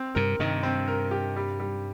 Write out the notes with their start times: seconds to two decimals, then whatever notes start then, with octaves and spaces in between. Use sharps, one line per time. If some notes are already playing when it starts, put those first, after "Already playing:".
Already playing: C4
0.15 G2 C3 A#4
0.39 G2 C3 D#3
0.63 C4
0.88 A#4
1.11 G4
1.36 G3
1.60 G3